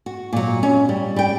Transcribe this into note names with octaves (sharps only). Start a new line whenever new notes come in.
F#4
A#2 F#3
C#4
G3
G3 G5